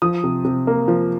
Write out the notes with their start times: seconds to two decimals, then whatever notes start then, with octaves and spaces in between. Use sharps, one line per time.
0.02 F3 D#6
0.24 C3
0.45 C3
0.67 A#3
0.88 F3